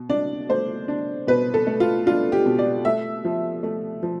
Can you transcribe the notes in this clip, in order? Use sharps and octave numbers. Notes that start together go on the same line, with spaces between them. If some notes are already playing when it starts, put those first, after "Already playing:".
Already playing: B2
D4 D5
A3 C5
D4
B2 B4
A4
A3
F4
D4 F4
G4
B2
D5
A3 E5
F3
A3
F3